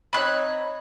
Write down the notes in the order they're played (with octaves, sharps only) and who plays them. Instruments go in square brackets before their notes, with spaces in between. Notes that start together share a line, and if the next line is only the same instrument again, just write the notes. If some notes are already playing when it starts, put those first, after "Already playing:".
[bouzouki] C4 D#4 C#5 [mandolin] B5 F#6